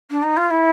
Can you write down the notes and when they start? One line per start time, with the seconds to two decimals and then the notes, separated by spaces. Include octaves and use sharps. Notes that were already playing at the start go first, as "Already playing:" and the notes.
0.10 D4
0.22 D#4
0.36 F4
0.50 E4